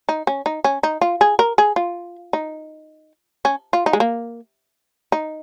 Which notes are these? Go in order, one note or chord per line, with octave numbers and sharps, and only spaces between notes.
D#4
C#4
D#4
C#4
D#4
F4
G#4
A#4
G#4
F4
D#4
C#4
F4
D#4
G#3
A#3
D#4